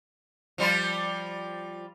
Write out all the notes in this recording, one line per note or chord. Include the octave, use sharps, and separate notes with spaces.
F3 G3 F4